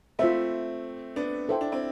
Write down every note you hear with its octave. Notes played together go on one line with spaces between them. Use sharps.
A3 C4 F4 C5 E5
B3 D4
E4 A4 C5 G5
D4
C4 E4